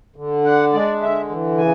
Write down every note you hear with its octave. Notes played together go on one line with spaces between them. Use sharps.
D3
D4 F#5
G#3 D5
D3 E5
E3
C#3 G#5